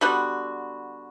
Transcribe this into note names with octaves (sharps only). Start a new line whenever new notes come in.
D3 G3 B3 F#4